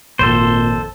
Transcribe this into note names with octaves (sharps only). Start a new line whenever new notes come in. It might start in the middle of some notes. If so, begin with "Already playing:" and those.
G#1 F2 A#2 A4 C5